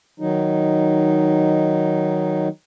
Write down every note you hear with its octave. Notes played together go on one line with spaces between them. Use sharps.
D#3 F#3 D#4